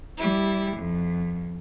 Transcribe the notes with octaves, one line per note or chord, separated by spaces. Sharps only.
G3 E4
F2